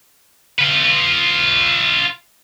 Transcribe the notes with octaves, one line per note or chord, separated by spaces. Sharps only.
F4 B4